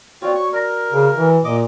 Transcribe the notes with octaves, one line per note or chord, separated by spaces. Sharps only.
C4 F4 F#4 C#5 D5
C#5 C#6
A#4 D5 A#6
C#3
E3
A#2 D#5 D6